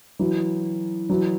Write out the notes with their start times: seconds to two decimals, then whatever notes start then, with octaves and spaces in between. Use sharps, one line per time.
0.19 E3 F#3
1.10 E3 F#3